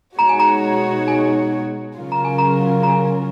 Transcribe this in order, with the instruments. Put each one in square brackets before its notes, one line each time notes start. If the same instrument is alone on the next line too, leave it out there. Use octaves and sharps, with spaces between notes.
[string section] B2 G#3 D#4 F#4 C#5 [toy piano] A#5
[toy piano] G#5
A#5
G#5
[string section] C#3 F#3 C#4 F4 A#4
[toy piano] A#5
G#5
A#5
A#5
G#5